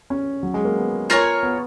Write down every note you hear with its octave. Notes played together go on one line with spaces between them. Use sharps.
C#4
F#3
G#3
A#3
B3
F4 A#4 C#5 G#5
B3